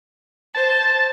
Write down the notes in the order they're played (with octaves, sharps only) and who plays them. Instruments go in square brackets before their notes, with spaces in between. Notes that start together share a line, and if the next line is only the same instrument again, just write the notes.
[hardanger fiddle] C5 [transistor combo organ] A5